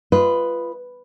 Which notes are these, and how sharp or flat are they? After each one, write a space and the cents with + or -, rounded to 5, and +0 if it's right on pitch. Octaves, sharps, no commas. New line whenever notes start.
F4 -20 B4 +0 D#5 +0